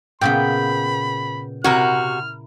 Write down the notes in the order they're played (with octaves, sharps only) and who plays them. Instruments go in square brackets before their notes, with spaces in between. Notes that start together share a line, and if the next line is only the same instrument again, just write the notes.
[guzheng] A#2 C#3 B3 [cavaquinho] G5 [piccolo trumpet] B5
[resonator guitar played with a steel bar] C3 F#4 [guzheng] E4 A#4 G#5 [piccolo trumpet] F6